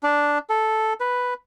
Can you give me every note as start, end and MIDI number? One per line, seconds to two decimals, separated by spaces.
0.03 0.38 62
0.50 0.93 69
1.00 1.34 71